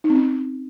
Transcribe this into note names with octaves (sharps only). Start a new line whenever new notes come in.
D#4
C4
C#4